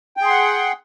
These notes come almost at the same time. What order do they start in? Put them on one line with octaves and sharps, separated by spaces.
G5 G#4 C6 F#5